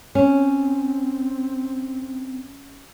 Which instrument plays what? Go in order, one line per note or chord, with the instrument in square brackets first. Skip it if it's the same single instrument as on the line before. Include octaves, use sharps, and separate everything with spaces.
[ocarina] C4 [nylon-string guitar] C#4